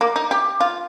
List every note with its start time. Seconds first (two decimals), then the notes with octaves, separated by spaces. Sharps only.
0.01 A#3
0.16 D#4
0.31 G4
0.60 F4